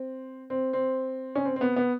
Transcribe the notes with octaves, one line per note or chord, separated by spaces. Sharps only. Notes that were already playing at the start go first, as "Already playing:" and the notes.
Already playing: C4
C4
C4
C#4
C4
C4
B3
B3